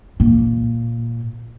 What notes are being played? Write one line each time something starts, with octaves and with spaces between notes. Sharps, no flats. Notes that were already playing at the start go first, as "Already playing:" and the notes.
A#2